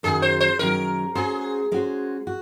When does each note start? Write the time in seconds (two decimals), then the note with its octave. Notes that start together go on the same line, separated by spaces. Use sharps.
0.03 F#2 D#3 F#3 G#4
0.22 C5
0.40 C5
0.59 F#2 D#3 F#3 A#4
1.15 G#3 C#4 F#4 G#4 C5
1.72 G#3 C#4 F#4 C5
2.27 F#4